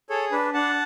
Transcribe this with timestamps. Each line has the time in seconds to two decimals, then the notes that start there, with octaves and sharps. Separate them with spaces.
0.10 G#4 A4 C#5
0.32 D4 B4
0.53 D4 F#5 A5